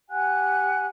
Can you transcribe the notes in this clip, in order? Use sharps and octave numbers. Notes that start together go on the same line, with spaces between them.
G4 F#5 G#5 F#6